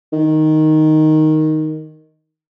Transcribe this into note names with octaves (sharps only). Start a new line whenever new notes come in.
D#3